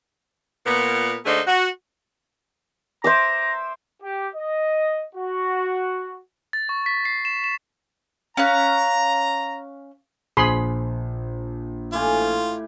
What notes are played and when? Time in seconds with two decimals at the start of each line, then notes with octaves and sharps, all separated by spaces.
0.66 A#2 B3 A#4
1.26 D3 A3 A#3 D#4 G#4 C5
1.47 F#4
3.04 C5 E5 A#5 D6
4.02 G4
4.34 D#5
5.15 F#4
6.53 A6
6.69 C#6
6.86 B6
7.05 C7
7.25 E7
7.44 E7
8.37 C#4 F5 A#5 F#6
10.37 A#1 G#4 C5 B5 C6
11.93 A2 F4 G4 G#5